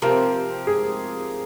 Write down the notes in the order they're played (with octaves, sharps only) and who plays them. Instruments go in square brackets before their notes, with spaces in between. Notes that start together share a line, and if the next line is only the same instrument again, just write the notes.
[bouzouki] C3 F3 C4 [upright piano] A#4
[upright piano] G#4